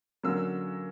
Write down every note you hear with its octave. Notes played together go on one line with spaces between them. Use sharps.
D3 F#3 A#3 C#4 E6